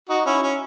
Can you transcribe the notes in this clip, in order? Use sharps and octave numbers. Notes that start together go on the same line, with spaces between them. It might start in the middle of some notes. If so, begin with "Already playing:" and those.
D#4 F#4
C#4 E4
C#4